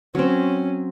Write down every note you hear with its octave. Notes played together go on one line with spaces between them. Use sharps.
F#3 C4 C#4